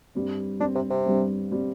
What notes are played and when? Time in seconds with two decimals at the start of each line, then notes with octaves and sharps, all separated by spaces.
0.15 G2 G3 C4
0.60 G2 G3 C4 D4
0.76 C3
0.91 C3
1.06 G2 G3 C4
1.51 G3 C4